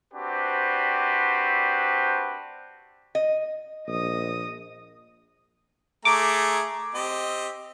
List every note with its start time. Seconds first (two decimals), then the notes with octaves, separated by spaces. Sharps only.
0.14 C4 D4 F#4 G4 B4 C5
3.15 D#5
3.88 A#1 D#5 D#6
6.05 A3 G#4 A#5 D6
6.95 C4 G4 D#5